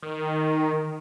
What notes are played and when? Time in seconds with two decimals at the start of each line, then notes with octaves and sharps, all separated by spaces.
0.02 D#3